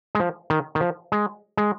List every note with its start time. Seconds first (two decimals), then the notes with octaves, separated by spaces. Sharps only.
0.15 G#3
0.20 F3
0.50 D#3
0.75 D#3
0.81 F3
1.12 G#3
1.57 G#3